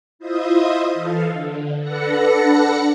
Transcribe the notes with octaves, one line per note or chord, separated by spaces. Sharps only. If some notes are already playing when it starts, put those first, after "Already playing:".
E4 F4 C5 D#5 E5 D#6
E3 A4 F5
D3
D4 A4 B4 F#5 A#6 C#7